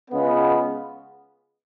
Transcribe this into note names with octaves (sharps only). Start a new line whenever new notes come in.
C#2 C#3 G#3 B3